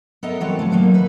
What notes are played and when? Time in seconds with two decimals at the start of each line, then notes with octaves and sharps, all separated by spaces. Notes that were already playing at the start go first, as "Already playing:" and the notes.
0.23 B3 A4 A#4 D#5 E5
0.40 E3 G3 C4 F#4 A4 C#5
0.59 E3 F3 A3
0.71 D#3 F#3 A3 A#3 D#4
0.94 E4 B4